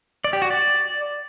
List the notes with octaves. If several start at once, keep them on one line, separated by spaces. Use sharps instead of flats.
D5
G4
F#4
D5